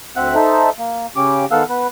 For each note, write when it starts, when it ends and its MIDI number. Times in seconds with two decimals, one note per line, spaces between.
0.16 0.35 38
0.16 0.35 60
0.16 0.35 76
0.16 0.35 78
0.16 0.35 90
0.35 0.70 63
0.35 0.70 69
0.35 0.70 72
0.35 0.70 76
0.79 1.06 58
1.16 1.45 49
1.16 1.45 61
1.16 1.45 67
1.16 1.45 86
1.51 1.63 51
1.51 1.63 59
1.51 1.63 69
1.51 1.63 77
1.51 1.63 78
1.51 1.63 88
1.69 1.87 59
1.69 1.87 71